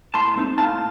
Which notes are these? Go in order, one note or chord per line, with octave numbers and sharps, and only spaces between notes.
A2 A5 C6
A3 C4 D#4
A2 F5 A5